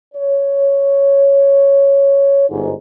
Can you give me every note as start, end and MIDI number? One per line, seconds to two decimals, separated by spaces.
0.14 2.47 73
2.49 2.72 31
2.49 2.72 44